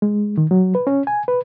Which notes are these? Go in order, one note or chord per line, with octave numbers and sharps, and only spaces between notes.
G#3
D#3
F#3
B4
C#4
G#5
B4